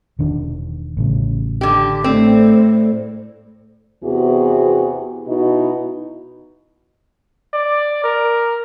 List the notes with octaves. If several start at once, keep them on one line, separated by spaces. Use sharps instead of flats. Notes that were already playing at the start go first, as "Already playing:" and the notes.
E1 D#3 D4
A1 C#3
D3 G4
A2 C4 A4 C5 D5
E2 C3 E3 B3 F#4 G#4
B2 D#4 E4 F#4
D5
A#4